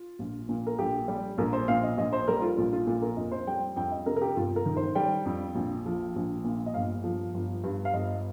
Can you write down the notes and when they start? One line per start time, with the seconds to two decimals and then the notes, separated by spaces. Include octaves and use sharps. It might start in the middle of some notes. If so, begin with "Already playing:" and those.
Already playing: F4
0.19 A#1
0.49 A#2
0.67 A#4
0.79 A#1 G4
1.08 G3
1.38 A#1 A#4
1.53 C5
1.68 A#2 F5
1.83 D#5
1.97 A#1 D#5
2.13 C5
2.28 G3 A#4
2.42 F4
2.57 A#1 F4
2.73 F4
2.87 A#2 F4
3.02 A#4
3.17 F2 D#5
3.32 C5
3.47 G3 G5
3.76 F2 G5
3.92 D#5
4.06 C3 A#4
4.16 A#4
4.22 G4
4.36 G1 F4
4.56 A#4
4.66 D#3
4.77 C5
4.95 G3 G5
5.26 F2
5.55 A#1
5.86 F3
6.16 A#1
6.44 A#2
6.66 D#5
6.74 G1 F5
7.04 F3
7.34 G1
7.64 G2
7.85 F5
7.94 G1 D#5